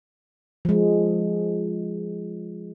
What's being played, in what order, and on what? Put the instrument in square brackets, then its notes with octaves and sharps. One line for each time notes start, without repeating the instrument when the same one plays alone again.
[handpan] F3 G#3